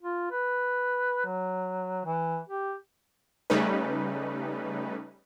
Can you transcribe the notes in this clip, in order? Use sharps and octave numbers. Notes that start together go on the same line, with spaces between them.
F4
B4
F#3
E3
G4
C#3 G3 A3 C#4 D#4 B4